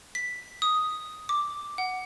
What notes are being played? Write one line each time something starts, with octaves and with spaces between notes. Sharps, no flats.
B6
D#6
D6
F#5